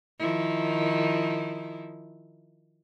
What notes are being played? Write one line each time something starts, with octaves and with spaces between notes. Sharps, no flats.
D#3 F3 E4